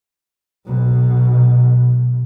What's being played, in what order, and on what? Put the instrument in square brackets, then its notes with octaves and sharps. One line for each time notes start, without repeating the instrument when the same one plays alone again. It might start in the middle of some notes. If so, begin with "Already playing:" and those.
[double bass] B1 B2